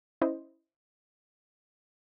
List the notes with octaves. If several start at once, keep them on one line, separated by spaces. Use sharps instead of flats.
C#4 E4 C5 D#5